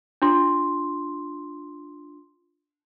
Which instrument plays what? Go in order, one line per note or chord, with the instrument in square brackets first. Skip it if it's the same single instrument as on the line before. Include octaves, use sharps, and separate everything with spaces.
[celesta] D4 F4 C6